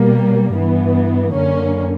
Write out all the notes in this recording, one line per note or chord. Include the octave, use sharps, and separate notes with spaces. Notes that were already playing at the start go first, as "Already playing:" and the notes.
Already playing: B2 G3 A#3
G2 E3 B3
F#2 D3 A#3 C#4